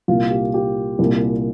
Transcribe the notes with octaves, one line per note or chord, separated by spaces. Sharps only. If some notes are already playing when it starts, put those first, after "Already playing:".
C2 A#2 F4
G4
G4
C2 A#2